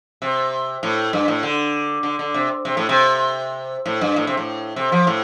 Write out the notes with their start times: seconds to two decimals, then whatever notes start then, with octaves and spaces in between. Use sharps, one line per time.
0.22 C3
0.83 A2
1.13 G2
1.28 A2
1.43 D3
2.03 D3
2.19 D3
2.34 C3
2.65 C3
2.77 A2
2.89 C3
3.86 A2
4.01 G2
4.16 A2
4.27 C3
4.37 A2
4.76 C3
4.92 F3
5.07 A2